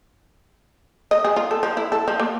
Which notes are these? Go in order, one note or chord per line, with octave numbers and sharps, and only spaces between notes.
D#5
G#4
F4
A4
F3
E4
A4
F3
A#3